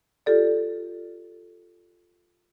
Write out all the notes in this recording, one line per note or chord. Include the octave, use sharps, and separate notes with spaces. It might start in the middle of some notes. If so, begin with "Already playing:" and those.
F4 G4 A4 D5